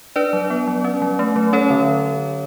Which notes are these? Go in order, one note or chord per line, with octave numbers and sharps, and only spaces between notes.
D4 B4 D5
F#3
B3
F#3
C#4
F#3
A3
F#3
C#4 A4 C#5
D3